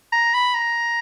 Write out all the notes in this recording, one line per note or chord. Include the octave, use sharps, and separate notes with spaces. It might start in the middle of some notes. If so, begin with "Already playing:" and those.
A#5
B5
A#5